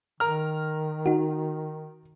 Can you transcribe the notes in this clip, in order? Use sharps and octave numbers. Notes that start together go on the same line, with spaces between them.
D#3 A#4 A#5 F6
D#4 F#4